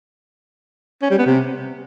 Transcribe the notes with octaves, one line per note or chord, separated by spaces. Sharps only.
C#4
G3
B3
C3